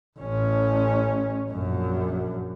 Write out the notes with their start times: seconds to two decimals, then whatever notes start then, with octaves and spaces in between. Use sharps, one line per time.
0.19 A1 C#4
1.51 A#1 F#2